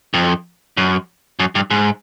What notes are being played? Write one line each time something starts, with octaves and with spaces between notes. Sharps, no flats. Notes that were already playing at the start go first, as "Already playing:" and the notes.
F2
F#2
F#2
G2
G#2